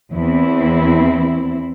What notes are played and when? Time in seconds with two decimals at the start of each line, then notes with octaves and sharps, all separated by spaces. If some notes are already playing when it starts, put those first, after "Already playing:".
0.13 E2 C4 E4